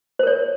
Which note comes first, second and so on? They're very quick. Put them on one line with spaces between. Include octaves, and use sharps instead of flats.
C5 A#4 C#5